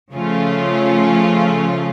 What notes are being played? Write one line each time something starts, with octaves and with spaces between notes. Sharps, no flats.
C#3 F3 A3 C#4 F4